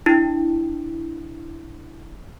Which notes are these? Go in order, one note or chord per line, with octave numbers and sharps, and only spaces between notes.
D4 E4